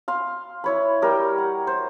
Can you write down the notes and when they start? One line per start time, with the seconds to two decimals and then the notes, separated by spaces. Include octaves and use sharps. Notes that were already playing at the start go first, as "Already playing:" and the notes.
0.08 F5 C6
0.64 E4 C#5 B5
1.02 G3 A#4 G5
1.38 F#5
1.67 C5